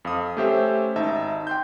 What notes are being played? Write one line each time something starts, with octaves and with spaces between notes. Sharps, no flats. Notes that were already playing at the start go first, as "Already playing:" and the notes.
F2 F5 D#6
A3 C#4 G4 C5 E5
G#1 D#4 E5 A5
G5 C6 G6